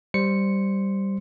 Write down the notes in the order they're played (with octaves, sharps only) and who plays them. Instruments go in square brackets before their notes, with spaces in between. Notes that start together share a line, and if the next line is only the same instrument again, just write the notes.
[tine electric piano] G3 C5 C#7